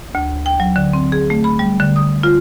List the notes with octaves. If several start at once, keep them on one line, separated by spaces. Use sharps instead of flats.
D2
G5
F#3
D3
C4
G#4
A3
B5
G3
D3
D#6
F4